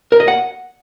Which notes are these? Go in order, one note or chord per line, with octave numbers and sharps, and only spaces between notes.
A#4
D#5
F#5